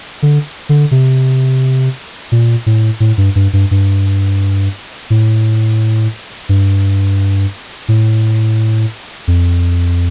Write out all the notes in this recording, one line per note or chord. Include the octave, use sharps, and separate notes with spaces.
D3
D3
C3
A#2
A2
A2
G2
G2
G2
G2
A2
G2
A2
F2